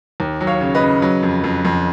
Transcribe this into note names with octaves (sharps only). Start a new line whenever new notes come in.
D#2
F#3
C#5 F5
C#3
B4 D#5
C#3
F#3
F2
F2
F2